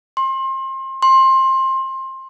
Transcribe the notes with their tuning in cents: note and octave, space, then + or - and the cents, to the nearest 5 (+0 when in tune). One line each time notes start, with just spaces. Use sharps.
C6 +30
C6 +20